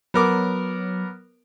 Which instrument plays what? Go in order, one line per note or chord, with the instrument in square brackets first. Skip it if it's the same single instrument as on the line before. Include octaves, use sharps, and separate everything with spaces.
[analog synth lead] F#3 [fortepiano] B3 A#4 D6